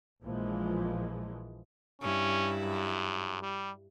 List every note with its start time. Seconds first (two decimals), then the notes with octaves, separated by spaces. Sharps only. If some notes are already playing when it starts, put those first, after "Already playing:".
0.23 A#1 A#2 E3 F3 G#3
2.02 G2 C#4 E4
2.61 F#2
3.42 G3